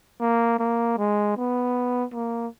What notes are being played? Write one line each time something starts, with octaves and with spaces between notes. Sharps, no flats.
A#3
A#3
G#3
B3
A#3